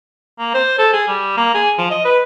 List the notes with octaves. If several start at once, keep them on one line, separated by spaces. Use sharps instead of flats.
A#3
C5
A4
G#4
G3
A#3
G#4
F3
D#5
B4